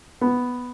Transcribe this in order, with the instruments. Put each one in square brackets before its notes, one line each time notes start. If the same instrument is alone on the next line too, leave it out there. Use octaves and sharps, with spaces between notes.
[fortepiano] B3